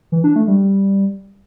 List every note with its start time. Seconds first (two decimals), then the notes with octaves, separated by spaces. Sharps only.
0.12 E3
0.24 D4
0.36 A3
0.48 G3